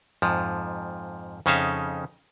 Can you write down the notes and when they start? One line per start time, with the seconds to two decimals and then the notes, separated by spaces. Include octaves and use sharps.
0.22 F2 G#2 F3
1.46 F2 C#3 C#4 D#4 E5 F5